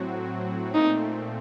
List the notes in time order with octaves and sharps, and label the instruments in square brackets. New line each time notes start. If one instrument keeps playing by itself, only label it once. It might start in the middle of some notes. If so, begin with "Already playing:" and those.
Already playing: [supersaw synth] A2 F#3 C4 F#4
[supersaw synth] A#2 A3 C4 [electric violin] D#4